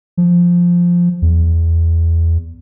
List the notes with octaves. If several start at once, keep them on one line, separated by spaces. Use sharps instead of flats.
F3
E2